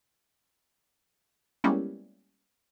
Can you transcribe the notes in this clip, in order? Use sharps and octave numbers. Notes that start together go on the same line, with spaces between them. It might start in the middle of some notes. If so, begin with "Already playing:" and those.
G3 G#3 A#3 B3 C#4 E4